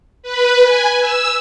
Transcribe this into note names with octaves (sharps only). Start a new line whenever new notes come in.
B4
G#5
E6